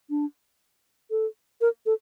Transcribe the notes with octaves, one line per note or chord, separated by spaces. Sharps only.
D4
A4
A#4
A4